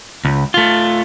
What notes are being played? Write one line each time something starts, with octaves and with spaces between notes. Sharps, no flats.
C#2
A3 F4